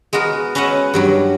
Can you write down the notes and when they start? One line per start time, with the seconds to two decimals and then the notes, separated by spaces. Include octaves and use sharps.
0.13 G#3 B3 F#4 A#4
0.55 C#4 B4 D#5 E5 F#5
0.94 G2 F#3 G3